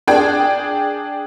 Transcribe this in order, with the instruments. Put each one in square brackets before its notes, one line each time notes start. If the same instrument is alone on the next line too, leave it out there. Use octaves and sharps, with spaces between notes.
[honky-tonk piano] D4 G#4 D5 G5